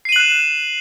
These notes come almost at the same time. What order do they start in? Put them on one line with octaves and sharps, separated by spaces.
C7 D#7 F#7 F#6 E7